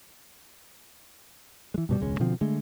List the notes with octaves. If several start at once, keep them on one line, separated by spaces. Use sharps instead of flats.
E3 G#3
G2 B2 G3
E1 C#2 G#3 C#4
B2 D3 F3 C4
D3 G#3 A3